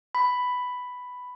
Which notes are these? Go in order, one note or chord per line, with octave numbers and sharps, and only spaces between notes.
B5